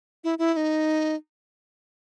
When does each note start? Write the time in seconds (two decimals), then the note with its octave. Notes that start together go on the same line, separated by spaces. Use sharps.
0.24 E4
0.39 E4
0.53 E4
0.57 D#4